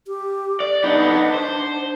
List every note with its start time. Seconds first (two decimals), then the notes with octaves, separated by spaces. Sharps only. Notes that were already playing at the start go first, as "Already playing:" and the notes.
0.07 G4
0.60 D5
0.84 B3 D4 D#4
1.34 C5